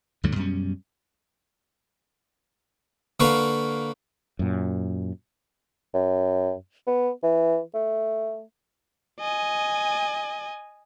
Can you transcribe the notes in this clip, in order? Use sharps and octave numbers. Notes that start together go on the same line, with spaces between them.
D2 G2 D3 F#3
F#2 B2 G3 C#4
D3 A#3 B4 F5 C#6
F#2 A#2
F#2
B3
E3
A3
D#5 G#5